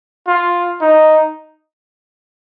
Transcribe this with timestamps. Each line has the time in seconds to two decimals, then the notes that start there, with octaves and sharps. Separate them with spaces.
0.27 F4
0.81 D#4